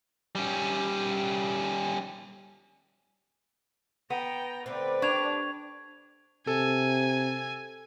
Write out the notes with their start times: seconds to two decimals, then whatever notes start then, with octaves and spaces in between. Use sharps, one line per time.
0.35 G3 C#4
4.10 B3 G5 A#5
4.66 D3 A3 C4 B4 D5
5.02 D4 G4 C#6 G#6 F7
6.47 C3 A4 G#5